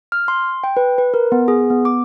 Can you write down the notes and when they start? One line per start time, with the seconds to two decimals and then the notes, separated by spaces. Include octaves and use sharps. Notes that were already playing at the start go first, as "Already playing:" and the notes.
0.12 F6
0.28 C6
0.64 G5
0.77 B4
0.98 B4
1.14 A#4
1.32 B3
1.48 G#4
1.70 B3
1.85 D6